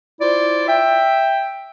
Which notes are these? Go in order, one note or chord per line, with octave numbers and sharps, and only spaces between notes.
E4 F4 C5 D5
E5 G5